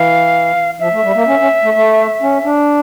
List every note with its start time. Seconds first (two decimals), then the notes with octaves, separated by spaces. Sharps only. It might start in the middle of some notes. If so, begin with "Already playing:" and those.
Already playing: E3 F5
0.80 F3 E5
0.92 A3
1.04 G3
1.15 A#3
1.27 C#4
1.39 C#4
1.63 A3
1.74 A3
2.22 C#4
2.44 D4